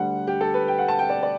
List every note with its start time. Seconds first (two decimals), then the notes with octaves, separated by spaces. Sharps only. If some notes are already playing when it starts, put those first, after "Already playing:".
Already playing: D2 D3 G3 F#5
0.27 G4
0.41 A4
0.54 B4
0.68 G5
0.78 F#5
0.88 A5
0.99 G5
1.09 D5
1.23 D5